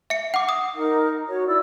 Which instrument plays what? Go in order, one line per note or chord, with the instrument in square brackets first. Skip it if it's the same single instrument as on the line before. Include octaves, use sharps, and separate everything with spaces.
[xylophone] E5 C#7
F#5 D6
D#6
[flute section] D#4 A#4
F#4 C#5
E4 D5 E6